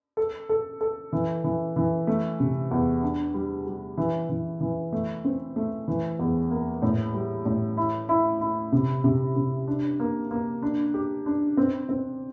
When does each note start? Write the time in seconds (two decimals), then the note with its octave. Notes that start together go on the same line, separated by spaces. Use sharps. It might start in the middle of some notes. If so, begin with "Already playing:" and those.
0.17 A4
0.49 A4
0.81 A4
1.13 E3
1.44 E3
1.76 E3
2.07 A3
2.40 C3
2.71 E2
3.03 D4
3.34 G3
3.66 G3
3.97 E3
4.29 E3
4.61 E3
4.93 A3
5.25 C4
5.56 A3
5.88 E3
6.19 E2
6.50 A#3
6.82 A2
7.14 G3
7.45 A2
7.77 E4
8.09 E4
8.41 E4
8.72 C3
9.04 C3
9.36 C3
9.67 D4
10.00 A#3
10.31 A#3
10.62 D4
10.94 G4
11.26 D4
11.57 C4
11.89 C4